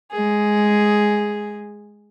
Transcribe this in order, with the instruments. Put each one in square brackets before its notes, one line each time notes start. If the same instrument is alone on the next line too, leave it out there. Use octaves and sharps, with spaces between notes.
[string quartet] G#3 G#4